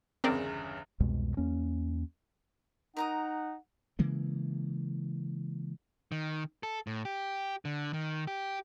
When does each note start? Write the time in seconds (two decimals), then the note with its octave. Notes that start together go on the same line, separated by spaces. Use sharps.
0.24 G1 E2 C#3 C4 A#4 D5
1.00 C2 F2 B2 G#3
1.37 E2 A#3 C#4
2.97 D#4 A#4 F#5 A#5 D#6
3.99 C#3 E3 G#3 A#3
6.12 D#3
6.63 A4
6.87 A2
7.05 G4
7.65 D3
7.93 D#3
8.27 G4